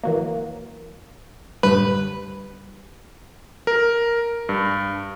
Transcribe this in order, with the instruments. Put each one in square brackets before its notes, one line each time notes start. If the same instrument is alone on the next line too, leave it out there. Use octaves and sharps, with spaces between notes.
[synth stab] E3 F#3 A#3
[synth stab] F#2 A2 D3 [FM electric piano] G3 [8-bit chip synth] B4
[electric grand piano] A#4
G2